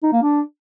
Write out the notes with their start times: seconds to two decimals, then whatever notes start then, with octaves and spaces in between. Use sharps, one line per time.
0.03 D#4
0.13 A#3
0.22 D4